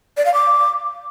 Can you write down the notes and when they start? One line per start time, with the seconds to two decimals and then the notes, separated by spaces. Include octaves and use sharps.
0.17 D5
0.25 F5
0.34 D6